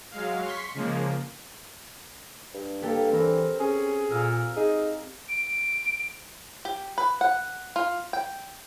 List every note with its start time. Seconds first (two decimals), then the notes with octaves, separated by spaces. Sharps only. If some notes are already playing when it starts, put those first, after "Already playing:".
0.11 F#3 G#3 F5
0.43 C6 C#6 B6
0.74 C#3 F3 G#3 A#3
2.54 G2
2.82 A#3 G4 A4 G5
3.12 E3 C4 A#4
3.60 C#4 G#4
4.10 A#2 F5 A#5 E6
4.57 D#4 G#4
5.29 D7
6.65 G4
6.98 B4
7.21 F#5
7.76 F4
8.13 G5